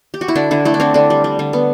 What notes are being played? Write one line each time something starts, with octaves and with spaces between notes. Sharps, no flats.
G4
F#4
E4
D3 D4
D3 E4
A3 E4
D4
D3 C4
D3 D4
G3
G3
D3
B3